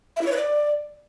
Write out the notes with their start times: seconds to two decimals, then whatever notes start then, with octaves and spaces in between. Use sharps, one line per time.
0.16 E5
0.21 E4
0.26 C#5
0.31 B4
0.36 D5